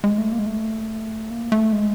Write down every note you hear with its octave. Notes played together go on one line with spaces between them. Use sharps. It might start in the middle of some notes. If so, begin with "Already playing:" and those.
G#3
A3
A#3
G#3
A3
A#3
A3
G#3